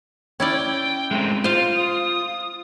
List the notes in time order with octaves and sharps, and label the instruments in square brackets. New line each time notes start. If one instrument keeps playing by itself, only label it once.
[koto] C#4 E4 D5 [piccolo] G5
[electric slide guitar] G#3 A3 C4
[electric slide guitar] F4 [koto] C5 F5
[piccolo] D#6